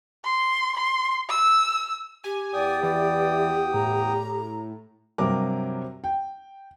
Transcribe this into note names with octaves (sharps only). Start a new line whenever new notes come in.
C6
C6
E6
G4 G#5
E2 D5 G5 D#6
E3 D5
A2 A#5
G2 C3 F#3 A#4 D6
G5